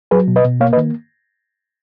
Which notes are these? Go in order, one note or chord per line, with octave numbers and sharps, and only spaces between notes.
F#3 G#4 B4
B2
B4 D#5
B2
A#3 C#5 F5
B4 D#5
D#3